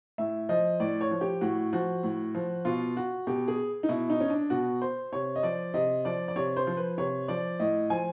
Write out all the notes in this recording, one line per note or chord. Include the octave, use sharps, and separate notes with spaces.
A2 E5
F3 D#5
A2 D5
C#5
F3
G4
A2 F#4
F3 F#4
A2
F3
B2 F4
F#4
B2 G4
G#4
D#4
B2 E4
D#4
C#4
D4
B2 F#4
C5
C3 C#5
D#5
F3 D5
C3 D#5
F3 D5
D5
C3 C#5
C5
F3
B4
C3 C#5
F3 D5
A2 D#5
F3 G#5